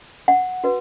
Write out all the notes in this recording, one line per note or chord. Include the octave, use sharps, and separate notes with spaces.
F#5
F#4 B4